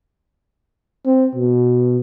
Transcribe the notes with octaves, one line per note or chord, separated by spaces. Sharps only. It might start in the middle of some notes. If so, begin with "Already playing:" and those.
C4
B2